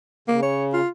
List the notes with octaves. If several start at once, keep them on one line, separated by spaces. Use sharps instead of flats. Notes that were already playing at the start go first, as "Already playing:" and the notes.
C#3 A#3
C#5
F4